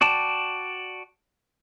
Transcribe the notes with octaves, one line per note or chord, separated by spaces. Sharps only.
F#4 D5 G5 A5